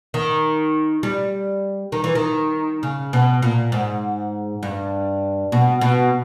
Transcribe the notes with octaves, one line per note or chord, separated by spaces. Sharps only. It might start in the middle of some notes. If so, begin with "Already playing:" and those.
D#3
G3
D#3
E3
D#3
C#3
B2
A#2
G#2
G2
B2
B2